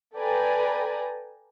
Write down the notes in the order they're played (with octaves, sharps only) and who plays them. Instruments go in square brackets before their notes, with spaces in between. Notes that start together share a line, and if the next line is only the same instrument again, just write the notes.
[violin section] A4 B4 D5 G5 G#5 A#5